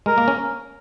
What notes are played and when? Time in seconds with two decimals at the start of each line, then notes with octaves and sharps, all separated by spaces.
0.06 G#3 A#4
0.18 A#3
0.28 C#4